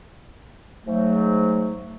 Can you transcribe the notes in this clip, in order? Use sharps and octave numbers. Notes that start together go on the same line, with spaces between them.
G#2 F#3 A3